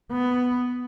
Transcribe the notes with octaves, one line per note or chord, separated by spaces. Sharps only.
B3